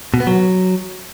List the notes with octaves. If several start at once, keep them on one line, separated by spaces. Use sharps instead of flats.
B2
B3
F#3